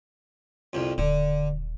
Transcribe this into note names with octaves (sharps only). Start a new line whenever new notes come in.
C2 F2
D#1 D3